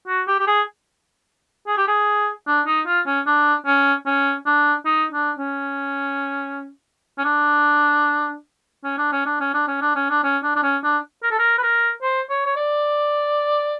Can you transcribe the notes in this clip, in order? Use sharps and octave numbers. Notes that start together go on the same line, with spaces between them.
F#4
G4
G4
G#4
G#4
G4
G#4
D4
D#4
F4
C#4
D4
C#4
C#4
D4
D#4
D4
C#4
C#4
D4
C#4
D4
C#4
D4
C#4
D4
C#4
D4
C#4
D4
C#4
D4
D4
C#4
D4
A#4
A4
A#4
B4
A#4
C5
C#5
C#5
D5